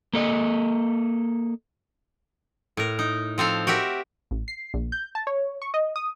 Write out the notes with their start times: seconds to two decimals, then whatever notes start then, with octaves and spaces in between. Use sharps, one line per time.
0.13 A#3 A4 D#5
2.77 A2 A#4
2.99 D#4
3.38 F3 C4 A4 F5
3.67 F#4 G4 A#4 E5
4.31 A1
4.48 C7
4.74 A#1
4.92 G6
5.15 A5
5.27 C#5
5.62 C#6
5.74 D#5
5.96 D#6